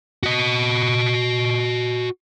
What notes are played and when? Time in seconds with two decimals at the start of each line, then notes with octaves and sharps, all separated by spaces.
0.23 F#4 D#5